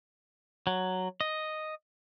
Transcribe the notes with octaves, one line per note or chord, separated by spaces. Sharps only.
F#3
D#5